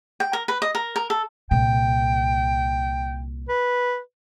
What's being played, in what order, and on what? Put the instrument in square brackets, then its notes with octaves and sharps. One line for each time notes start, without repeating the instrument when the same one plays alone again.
[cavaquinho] G5
A#4
B4
D#5
A#4
A#4
A4
[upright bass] C2 A#2 [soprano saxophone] G5
[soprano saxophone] B4